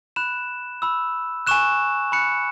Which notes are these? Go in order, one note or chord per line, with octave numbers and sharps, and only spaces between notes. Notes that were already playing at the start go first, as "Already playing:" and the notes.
B5 F#6 E7
B5 E6
G#5 C#6 F#6 E7
B5 F#6 C#7